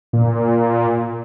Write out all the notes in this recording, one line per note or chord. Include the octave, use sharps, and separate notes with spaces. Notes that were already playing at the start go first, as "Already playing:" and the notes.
A#2